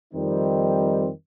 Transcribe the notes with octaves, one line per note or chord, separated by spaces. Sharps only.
F2 D#3 G3 C4 D#4